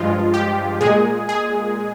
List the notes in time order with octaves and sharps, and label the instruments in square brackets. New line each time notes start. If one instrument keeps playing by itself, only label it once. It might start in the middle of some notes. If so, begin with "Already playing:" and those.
Already playing: [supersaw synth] G2 F3 G#3 F4
G4
A#2 G#3 G#4
G#4